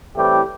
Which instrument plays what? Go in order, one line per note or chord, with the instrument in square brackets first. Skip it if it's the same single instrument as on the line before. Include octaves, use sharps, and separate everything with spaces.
[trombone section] A2 E3 G3 A3 C4 G4